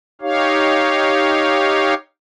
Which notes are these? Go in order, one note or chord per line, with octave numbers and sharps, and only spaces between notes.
D#4 G4 C#5 F5